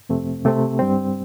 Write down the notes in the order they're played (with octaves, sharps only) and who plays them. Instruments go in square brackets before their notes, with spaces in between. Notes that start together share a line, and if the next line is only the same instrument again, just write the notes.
[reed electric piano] F2 C3 A3 C4
C3 A3 C4
G2 G3 C4